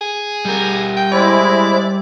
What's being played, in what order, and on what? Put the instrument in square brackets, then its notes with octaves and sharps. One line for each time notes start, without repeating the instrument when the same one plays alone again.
[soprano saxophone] G#4
[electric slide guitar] G3 A#4
[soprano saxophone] G5
[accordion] G#3 E4 [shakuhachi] C5 [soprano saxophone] D5